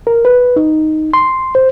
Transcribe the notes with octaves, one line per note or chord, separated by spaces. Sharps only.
A#4
B4
D#4
C6
C5